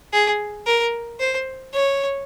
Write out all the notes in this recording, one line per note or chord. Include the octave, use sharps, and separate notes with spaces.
G#4
A#4
C5
C#5